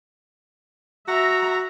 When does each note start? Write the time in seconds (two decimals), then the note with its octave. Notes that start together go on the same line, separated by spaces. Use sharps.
1.08 F#4 E5 A#5